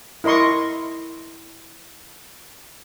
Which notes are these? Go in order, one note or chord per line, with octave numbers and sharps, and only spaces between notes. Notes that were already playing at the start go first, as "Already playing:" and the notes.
E4 A#4 D#5 C6 C#6